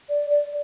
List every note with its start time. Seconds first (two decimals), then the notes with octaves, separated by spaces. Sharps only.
0.09 D5
0.30 D5